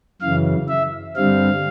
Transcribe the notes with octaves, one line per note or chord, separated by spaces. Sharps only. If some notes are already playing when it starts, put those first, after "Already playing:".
F#2 C#3 E3 F5
E5
G2 D3 G3 C4 F5